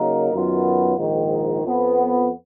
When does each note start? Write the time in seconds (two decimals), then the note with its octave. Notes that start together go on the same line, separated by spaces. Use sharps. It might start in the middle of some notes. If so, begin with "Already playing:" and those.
Already playing: C#3 F#3 A#3 D#4 A#4
0.32 F#2 D#3 F#3 B3 F4
0.97 A#1 G#2 D#3
1.63 F2 F3 B3